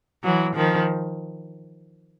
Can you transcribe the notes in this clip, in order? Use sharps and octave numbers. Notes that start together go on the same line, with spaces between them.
E3 F#3
D#3 F3